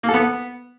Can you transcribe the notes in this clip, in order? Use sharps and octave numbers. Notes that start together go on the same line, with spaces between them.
A#3
A4
B3